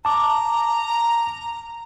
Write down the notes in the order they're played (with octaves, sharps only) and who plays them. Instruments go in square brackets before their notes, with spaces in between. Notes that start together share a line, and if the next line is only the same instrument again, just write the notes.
[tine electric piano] A5 D6 [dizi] A#5